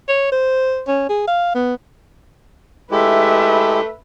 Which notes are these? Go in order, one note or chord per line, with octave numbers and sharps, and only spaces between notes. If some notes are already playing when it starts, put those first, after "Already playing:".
C#5
C5
C#4
G#4
F5
B3
G#3 A3 E4 G4 A4 B4 E5